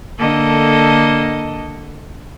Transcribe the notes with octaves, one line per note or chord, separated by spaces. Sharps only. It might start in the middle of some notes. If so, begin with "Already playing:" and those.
D3 A#3 A4 D#5